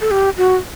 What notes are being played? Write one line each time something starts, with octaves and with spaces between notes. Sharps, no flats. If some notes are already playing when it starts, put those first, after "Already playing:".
A4
G4
F#4